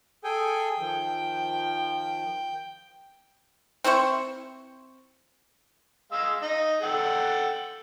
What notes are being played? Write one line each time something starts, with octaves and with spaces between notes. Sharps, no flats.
G#4 A4 G5 G#5
D#3 F3
C4 E4 C5 C#6
G#3 F5 E6
D#4 D#5
A4 F#5 G5